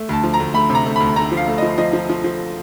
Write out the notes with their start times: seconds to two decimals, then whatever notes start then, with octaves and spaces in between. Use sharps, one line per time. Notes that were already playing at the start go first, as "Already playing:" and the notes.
Already playing: A3
0.09 D2 A5
0.23 F3
0.34 A#5
0.40 D2
0.54 A3 B5
0.69 C3
0.75 A#5
0.86 A3
0.96 B5
1.00 D2
1.16 A3 A#5
1.31 F3
1.37 F5
1.48 A3
1.58 D#5
1.62 F3
1.78 F3 D#5
1.93 F3
2.09 F3
2.24 F3